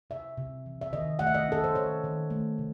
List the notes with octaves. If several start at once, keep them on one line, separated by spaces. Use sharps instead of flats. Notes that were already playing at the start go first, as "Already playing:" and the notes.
C3 E5
C3
E3
E5
D#3 D#5
A3 F#5
E5
D#5
C#4 A4
C5
D#3 C#5
D#3
A3
C3